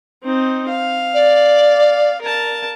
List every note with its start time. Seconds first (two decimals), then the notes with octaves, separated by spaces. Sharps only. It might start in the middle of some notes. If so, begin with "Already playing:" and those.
0.24 C4 D#4
0.68 F5
1.14 D5
2.22 A#4 A5